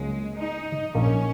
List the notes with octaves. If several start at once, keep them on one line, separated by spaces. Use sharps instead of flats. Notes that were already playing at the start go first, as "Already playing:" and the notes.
Already playing: C#2 C#3 F#3 G#3 A#3
D#4
A#1 A#2 A#3 C#4 D#4